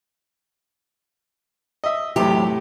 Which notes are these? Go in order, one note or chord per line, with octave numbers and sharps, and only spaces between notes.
D#5 E5
E2 A2 C3 F#3 G4